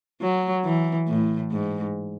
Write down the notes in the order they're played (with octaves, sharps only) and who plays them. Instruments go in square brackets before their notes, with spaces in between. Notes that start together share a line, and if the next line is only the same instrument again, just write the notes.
[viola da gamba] F#3
E3
A2
G#2